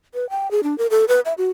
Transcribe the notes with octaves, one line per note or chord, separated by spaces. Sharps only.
B4
G5
G#4
D4
A#4
A4
B4
E5
F#4